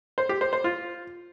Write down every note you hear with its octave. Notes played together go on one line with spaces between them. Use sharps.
C5
G4
C5
C5
F4